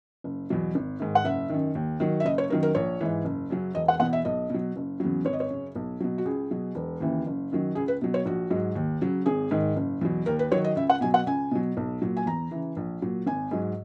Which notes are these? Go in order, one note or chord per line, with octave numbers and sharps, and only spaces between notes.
F#1
E2 B2 F#3
G#1
G#2 D#3
F#5
F#1 E5
F#2 D#3
D#2
D#3 F#3
E5
F#1 D#5
C#5
F#2 D#3 F#3 A#4
A#4
A#1 C#5
G#2 E3
F#1
F#2 C#3 F#3
E1 D#5
F#5
E2 B2 F#5
E5
B1 D#5
B2 F#3
F#1
E2 C#3 F#3
G#1 C#5
D#5
C#5
F#2 C#3
B1
B2 F#3
F#4
C#2 G#4
B2 F#3
E1
D#2 C#3 E3
F#1
F#2 D#3 F#3
C#2 G#4
B4
B2 F#3
C#5
A#1 F#4
G#2 F#3
D#2
C#3 F#3
G#1 G#4
G#2 D#3
F#1
E2 B2 F#3
D#2 A#4
B4
D#3 F#3 C#5
D#5
C#2 E5
F#5
B2 F#3 G#5
F#5
C#2 G#5
B2 F#3
B1
A#2 F#3
G#5
E2 A#5
C#3 E3
A#1
A#2 F#3
G#1 G#5
G#2 F#3